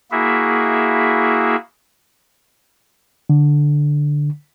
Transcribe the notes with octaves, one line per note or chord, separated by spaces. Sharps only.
A#3 E4 F#4 G#4 E5
D3